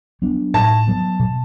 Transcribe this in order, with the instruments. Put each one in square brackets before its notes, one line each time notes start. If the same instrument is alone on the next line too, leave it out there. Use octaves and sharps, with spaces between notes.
[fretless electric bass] F#3 B3 D4
[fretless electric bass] A2 [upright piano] A5
[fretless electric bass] F#3 B3
B2